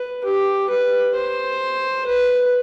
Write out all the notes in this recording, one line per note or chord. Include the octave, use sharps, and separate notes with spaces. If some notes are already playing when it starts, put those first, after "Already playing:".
Already playing: B4
G4
B4
C5
B4